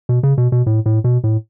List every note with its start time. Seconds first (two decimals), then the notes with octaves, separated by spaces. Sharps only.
0.09 B2
0.23 C#3
0.38 B2
0.52 B2
0.66 A2
0.86 A2
1.04 B2
1.24 A2